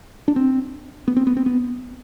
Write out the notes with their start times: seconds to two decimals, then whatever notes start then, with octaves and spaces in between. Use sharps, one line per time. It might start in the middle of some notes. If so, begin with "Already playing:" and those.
0.28 D4
0.36 C4
1.08 B3
1.16 C4
1.27 B3
1.37 C4
1.46 B3